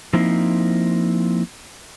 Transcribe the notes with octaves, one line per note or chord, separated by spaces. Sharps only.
F3 A#3 C4 D#4 E4